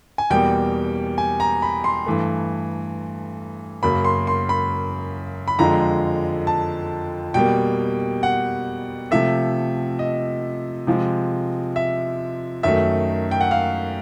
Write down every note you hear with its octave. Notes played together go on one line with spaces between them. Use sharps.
G#5
E2 B2 G3 A#3 G5
G#5
A#5
B5
C6
G2 E3 A3
F#2 C#3 F#3 A#3 B5
C6
C6
B5
B5
F2 D3 F3 G#3 A#5
A5
B2 G3 A#3 G5
F#5
C3 F3 A3 E5
D#5
C3 F3 G#3
E5
F#2 D#3 F#3 A3 E5
G5
F#5
F5